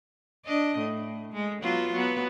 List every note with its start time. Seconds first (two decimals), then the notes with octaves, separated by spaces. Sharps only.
0.45 D4 D#5
0.79 A2
1.33 G#3
1.62 F#3 B3 F4
1.92 F#3 B3